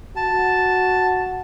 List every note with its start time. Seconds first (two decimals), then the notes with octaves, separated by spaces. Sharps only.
0.16 F#4 A5